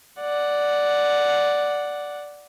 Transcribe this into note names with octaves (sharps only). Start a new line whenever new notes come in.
D5 F#5